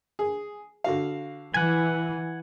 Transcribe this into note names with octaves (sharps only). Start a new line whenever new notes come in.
G#4
D3 F#4 F5
E3 F#5 G#5